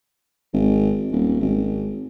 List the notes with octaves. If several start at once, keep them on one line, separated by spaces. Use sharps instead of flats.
G#1
D#1
G#1